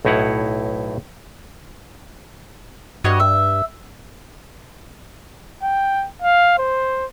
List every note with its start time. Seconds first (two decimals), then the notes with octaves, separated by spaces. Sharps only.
0.05 B1 A2 D#4 E4 C#5 F#5
3.04 G2 F#4 C#5 D#5
3.20 E5
5.63 G5
6.22 F5
6.59 C5